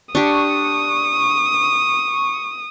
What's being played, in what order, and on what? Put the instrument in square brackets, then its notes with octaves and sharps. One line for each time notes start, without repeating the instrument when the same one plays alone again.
[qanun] D4 G4 [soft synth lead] C#6 [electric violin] D#6